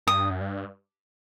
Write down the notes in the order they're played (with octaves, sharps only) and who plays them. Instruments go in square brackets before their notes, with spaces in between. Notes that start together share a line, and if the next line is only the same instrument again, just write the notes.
[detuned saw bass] G2 [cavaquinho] D#6
[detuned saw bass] F#2
G2